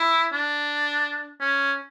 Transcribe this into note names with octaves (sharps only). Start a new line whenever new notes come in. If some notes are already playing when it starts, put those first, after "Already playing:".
Already playing: E4
D4
C#4